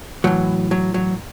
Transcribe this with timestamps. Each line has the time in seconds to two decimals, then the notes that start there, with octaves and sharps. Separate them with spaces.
0.24 A2 E3 F#3
0.71 F#3
0.94 F#3